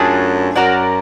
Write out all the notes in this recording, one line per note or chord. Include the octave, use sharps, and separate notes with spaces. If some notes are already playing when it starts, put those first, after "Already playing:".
Already playing: F#2 A3 D4 F4 G#4
F#2 F#4 A#4 D5 F#5